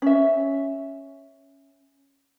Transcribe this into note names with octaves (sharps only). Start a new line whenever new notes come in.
C#4 E5